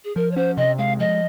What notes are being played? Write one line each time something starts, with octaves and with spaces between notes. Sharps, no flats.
G#4
F3 A#4
C#5
C#4 C5
C3 D#5
G#3 F5
F3 D#5